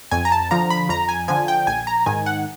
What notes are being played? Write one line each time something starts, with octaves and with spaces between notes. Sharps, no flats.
F2 G#5
A#5
A5
D3 F3 A#5
B5
F2 A#5
G#5
D3 F3 G#5
G5
A#1 G#5
A#5
G#2 D#3 G#5
F#5